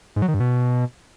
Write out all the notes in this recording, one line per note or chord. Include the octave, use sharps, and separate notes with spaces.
G#2
F#3
D#3
G2
B2